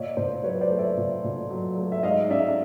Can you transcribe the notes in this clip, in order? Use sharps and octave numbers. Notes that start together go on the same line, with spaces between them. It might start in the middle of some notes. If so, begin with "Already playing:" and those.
Already playing: A#2 C#5 D#5
A#2 C5 D5
F#3 B4 C#5
C5 D5
A3
D5 E5
A#2
A#2
F#3
A3
E5
G#2 D#5 F5
C#4 D5 E5